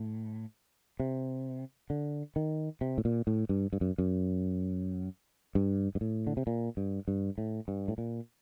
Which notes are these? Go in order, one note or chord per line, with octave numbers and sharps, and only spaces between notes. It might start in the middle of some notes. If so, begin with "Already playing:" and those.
Already playing: A2
C3
D3
D#3
C3
A2
A#2
A2
G2
G2
F#2
F#2
G2
G2
A2
D3
C3
A#2
G2
G2
A2
G2
A2
A#2